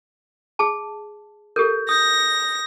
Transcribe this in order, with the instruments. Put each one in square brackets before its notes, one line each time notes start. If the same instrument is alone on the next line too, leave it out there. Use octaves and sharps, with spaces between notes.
[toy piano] G#4 A5
[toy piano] G4 A4 A#4 [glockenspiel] G6
[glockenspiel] D#6 G6 [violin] A#6